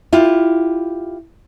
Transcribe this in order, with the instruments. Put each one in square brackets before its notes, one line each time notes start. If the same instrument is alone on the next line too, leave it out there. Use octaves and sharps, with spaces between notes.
[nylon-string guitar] E4 F4 G4